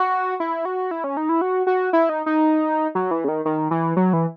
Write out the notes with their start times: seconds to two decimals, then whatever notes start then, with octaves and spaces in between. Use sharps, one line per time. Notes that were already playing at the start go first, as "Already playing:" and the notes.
Already playing: F#4
0.40 E4
0.65 F#4
0.91 E4
1.04 C#4
1.17 D#4
1.29 E4
1.41 F#4
1.67 F#4
1.93 E4
2.09 D#4
2.26 D#4
2.95 F#3
3.11 E3
3.24 C#3
3.28 D#3
3.45 D#3
3.71 E3
3.97 F#3
4.13 E3